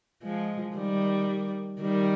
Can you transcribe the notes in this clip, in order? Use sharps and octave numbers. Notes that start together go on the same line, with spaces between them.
F3 G#3
D#3 G3
D#3 G3